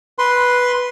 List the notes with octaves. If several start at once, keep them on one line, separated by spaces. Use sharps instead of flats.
B4 C6